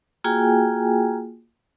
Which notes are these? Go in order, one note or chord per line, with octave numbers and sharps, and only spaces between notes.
A#3 F4 F#4 G#4 G5 G#5